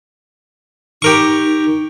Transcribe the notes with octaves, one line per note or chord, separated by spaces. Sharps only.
D#4 G4 A#4 C#6